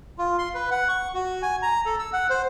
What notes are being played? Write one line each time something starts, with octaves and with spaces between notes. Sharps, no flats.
F4
C6
B4
F#5
C#6
F#4
G#5
A#5
A4
E6
F#5
C5